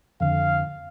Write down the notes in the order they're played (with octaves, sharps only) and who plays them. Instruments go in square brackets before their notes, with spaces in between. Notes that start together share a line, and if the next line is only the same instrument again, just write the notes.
[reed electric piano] F2 D3 [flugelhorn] F5